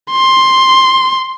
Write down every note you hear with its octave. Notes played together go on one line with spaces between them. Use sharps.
C6